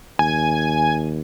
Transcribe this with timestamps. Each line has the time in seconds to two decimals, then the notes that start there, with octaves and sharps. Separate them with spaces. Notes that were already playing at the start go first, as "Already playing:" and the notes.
0.19 D#2 G#5